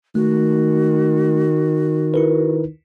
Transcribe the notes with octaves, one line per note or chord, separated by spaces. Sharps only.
D#3 A3 F#4
E4 A#4 B4